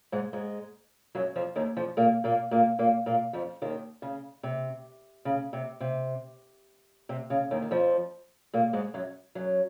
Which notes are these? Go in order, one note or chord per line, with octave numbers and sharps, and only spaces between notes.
G#2 G#3
G#2 G#3
F#2 F#3
F2 F3
D#2 D#3
F2 F3
A#2 A#3
A#2 A#3
A#2 A#3
A#2 A#3
A#2 A#3
F2 F3
D#2 D#3
C#3
C3
C#3
C3
C3
C3
C#3
D#2 D#3
D#3
F2 F3
A#2 A#3
G#2 G#3
F#2 F#3
F#2 F#3